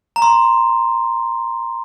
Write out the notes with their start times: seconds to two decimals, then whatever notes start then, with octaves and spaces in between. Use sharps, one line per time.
0.16 A#5
0.22 C6